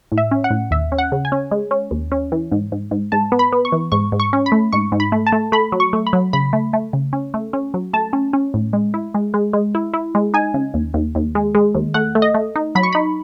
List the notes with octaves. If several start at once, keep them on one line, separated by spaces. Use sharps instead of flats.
A2
E5
C#4
F#5
A2
D#2 E5
C#4
F#5
C#3
G#5
C#4
G#3
C#4
D#2
C#4
E3
G#2
G#2
G#2
G#2 A5
B3
B5
B3
C#6
E3
G#2 C#6
G#2
C#6
C#4
B5
A3
G#2 C#6
G#2
B5
A3
A5
A3
A3 B5
F#3
C#6
A3
B5
F#3
C#3 B5
A3
A3
C#3
C#4
A3
C#4
F#3
A3 A5
C#4
C#4
A2
G#3
E4
G#3
G#3
G#3
E4
E4
G#3
D#4 G#5
C#3
D#2
D#2
D#2
G#3
G#3
D#2
A3 F#5
A3
D#5
A3
D#4
F#3 B5
C#6
D#4 B5